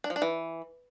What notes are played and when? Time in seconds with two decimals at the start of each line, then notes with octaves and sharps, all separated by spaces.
0.04 D4
0.10 F3
0.16 D4
0.22 E3